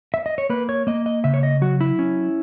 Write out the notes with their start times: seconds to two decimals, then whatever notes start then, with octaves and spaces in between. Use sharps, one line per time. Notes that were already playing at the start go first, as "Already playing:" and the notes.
0.14 E5
0.26 D#5
0.38 C#5
0.50 A#3 B4
0.69 C#5
0.87 A#3 D#5
1.06 D#5
1.24 C#3 E5
1.34 C#5
1.43 D#5
1.61 F#3 F#4
1.81 E4
1.99 C#4